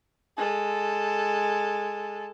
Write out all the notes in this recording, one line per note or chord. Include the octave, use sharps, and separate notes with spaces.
G#3 A4